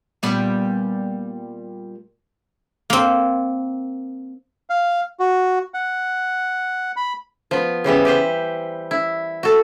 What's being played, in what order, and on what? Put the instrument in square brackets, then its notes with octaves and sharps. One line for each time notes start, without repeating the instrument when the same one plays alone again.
[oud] A#2 G3 B3
[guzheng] A#3 C4
[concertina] F5
F#4
F#5
B5
[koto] F3 B3
C#3 E3 G3 B3
G4 B4 C5
E4
F#4 A4